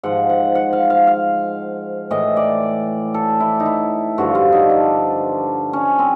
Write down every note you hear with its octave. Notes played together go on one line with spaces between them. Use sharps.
G#2 F3 F#5
F#5
F#5
F5
F5
F5
A2 E3 D#5
D5
A4
E4
D#4
E4
G2 D3 F3 F#4
F4
D#4
D4
C#4
C4